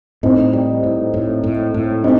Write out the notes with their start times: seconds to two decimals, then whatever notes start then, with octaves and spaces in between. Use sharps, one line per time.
0.23 A2 C4 D#4
0.53 G3
0.83 A2
1.14 A2
1.44 A2
1.74 A2
2.04 G3 C4 D#4